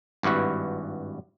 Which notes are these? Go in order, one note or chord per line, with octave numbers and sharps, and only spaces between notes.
G#1 G2 E4 F#4 B4